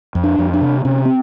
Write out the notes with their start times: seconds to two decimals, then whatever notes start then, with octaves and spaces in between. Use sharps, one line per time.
0.15 F2
0.24 D4
0.39 F2
0.54 D4
0.61 C3
0.85 C3 C#4
1.05 C4